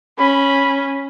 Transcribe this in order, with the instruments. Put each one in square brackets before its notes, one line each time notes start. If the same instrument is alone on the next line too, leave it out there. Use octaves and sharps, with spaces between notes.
[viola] C#4 [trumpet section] B5